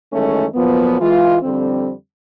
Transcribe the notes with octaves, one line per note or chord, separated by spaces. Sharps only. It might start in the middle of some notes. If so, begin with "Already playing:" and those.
F#2 D#3 E3 G#3 A3 C#4
A#2 F3 F#3 B3
E3 G#3 F4
F2 D3 G3 C4